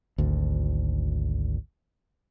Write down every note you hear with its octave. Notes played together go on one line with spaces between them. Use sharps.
G#1 D2